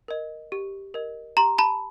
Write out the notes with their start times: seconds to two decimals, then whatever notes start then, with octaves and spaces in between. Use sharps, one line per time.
0.08 A#4 D#5
0.52 G4
0.94 A#4 D#5
1.37 G4 A#5 C6
1.58 A5 B5